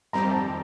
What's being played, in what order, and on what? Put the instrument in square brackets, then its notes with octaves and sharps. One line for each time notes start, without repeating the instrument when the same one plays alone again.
[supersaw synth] F2 D#3 G3 C4 G4 [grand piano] A#5
[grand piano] A5